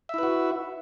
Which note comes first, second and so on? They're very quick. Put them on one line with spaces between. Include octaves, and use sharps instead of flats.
E5 E4 B4 F#4